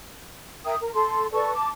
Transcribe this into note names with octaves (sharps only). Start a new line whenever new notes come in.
A#4 E5 G5 D#6
A#4
A4 C6
A4 B4 D5 C#6
A5 D6